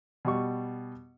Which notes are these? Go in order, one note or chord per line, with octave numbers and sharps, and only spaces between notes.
B2 G3 C#6